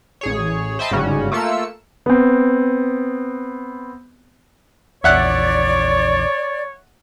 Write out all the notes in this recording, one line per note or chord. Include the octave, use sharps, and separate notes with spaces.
A1 G#4 C#5
C5 D#5 E5 G5 A5 B5
G1 G#2 C#3 G3 C#4 F#4
A3 A#3 F4 E6 C#7
B3 C4
A#1 E2 C#5 D5 E5 F#5 F#6